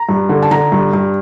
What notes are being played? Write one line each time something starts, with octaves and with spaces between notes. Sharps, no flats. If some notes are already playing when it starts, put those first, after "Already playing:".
Already playing: A#5
G2
D3
A5
D3 A#5
G2
G2